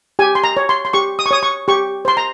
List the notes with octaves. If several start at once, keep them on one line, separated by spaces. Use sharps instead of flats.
G4 G#5
C6
A#5
C#5
C6
C6
G4 C#6
D#6
C#6
C#5 D#6
C#6
G4 C#6
C5 C6
A#5